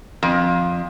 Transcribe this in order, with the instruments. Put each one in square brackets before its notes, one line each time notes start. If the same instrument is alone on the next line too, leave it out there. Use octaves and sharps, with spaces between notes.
[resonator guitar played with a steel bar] F2